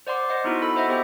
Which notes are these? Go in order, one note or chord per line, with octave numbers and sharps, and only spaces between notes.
C5 D5 F#5 C6 D6
C5 D#5 F#5 C6
B3 D#4 E4 F#4
A4 B5
F#4 C5 D#5 E5 F#5
B3 G4 C5 G5